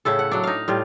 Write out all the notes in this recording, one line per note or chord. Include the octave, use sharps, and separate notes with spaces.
A2 C#3 E4 A4
F#5
F#3 D4
D#4 F5
A2 G3 F4